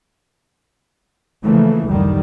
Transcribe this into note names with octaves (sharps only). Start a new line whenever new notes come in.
C#3 E3 F3 A3 A#3
F#1 D2 A2 D3 D#3 G3